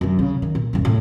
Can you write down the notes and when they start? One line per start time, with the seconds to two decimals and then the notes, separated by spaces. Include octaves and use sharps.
0.01 F#2 D3
0.19 C#3
0.42 D#3
0.55 A#2
0.73 D#1 G2
0.85 A2